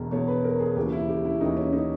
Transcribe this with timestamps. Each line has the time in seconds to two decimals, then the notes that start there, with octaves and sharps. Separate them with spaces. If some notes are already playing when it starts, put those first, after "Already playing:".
Already playing: E1 E2 B2
0.11 E1 E2 B2 C#5
0.28 B4
0.44 A#4
0.60 G#4
0.76 D#2 C#3 E3 G4
0.92 E4
1.09 G4
1.25 E4
1.40 D#2 C#3 E3 D#4
1.57 C#4
1.73 D#4